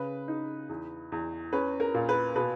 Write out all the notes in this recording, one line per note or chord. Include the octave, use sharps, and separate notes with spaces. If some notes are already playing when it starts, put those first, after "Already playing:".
Already playing: C#3 B4
D#4
E2
E2
C#4 B4
A#4
A#2
B4
B2 B4